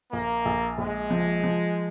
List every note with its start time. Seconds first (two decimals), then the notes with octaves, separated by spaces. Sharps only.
0.12 A#1 A#3
0.45 A#1
0.78 A#1 G#3
1.10 F3
1.44 F3